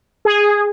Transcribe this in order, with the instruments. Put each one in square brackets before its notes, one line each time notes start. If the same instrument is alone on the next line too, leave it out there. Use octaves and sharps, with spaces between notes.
[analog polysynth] G#4